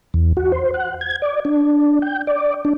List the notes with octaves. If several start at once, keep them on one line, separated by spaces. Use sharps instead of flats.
E2
F#4
C5
F#5
G#6
D5
D4
G5
D5
D4